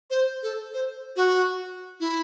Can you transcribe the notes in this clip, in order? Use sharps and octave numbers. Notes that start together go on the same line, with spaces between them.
C5
A4
C5
F#4
E4